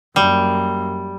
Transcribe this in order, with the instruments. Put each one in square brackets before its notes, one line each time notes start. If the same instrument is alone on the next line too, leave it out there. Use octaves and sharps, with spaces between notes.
[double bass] F#2 A#3 [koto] G3